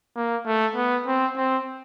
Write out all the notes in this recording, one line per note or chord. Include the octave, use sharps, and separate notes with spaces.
A#3
A3
B3
C4
C4